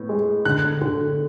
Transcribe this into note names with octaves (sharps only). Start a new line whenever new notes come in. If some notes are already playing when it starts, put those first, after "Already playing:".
Already playing: A2 B3
G#3
D3 F#6
D3